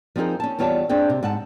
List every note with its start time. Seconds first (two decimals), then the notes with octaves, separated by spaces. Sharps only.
0.16 F3 C4 D#4 G#4 A#4
0.40 C#4 A5
0.59 E2 G3 F4 C#5 E5 A5
0.89 C4 D4 G#4 G5
1.10 C3
1.23 G#2 F#5 A5